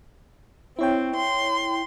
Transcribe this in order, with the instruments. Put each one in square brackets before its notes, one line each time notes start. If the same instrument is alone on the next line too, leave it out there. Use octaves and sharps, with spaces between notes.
[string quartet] C4 [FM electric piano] E4 C#5 G5
[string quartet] C6